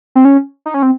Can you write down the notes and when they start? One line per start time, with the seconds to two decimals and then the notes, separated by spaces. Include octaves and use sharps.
0.15 C4
0.25 C#4
0.66 D#4
0.74 C#4
0.83 C4